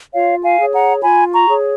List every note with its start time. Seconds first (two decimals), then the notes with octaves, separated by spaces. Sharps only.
0.13 F4 C#5 F5
0.43 F5 G#5
0.58 G#4 C#5
0.73 F#5 A#5
1.03 F4 G#5 B5
1.33 A#5 C#6
1.48 G#4 C#5